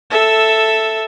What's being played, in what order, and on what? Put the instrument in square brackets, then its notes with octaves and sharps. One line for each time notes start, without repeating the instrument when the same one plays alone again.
[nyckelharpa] A4 E5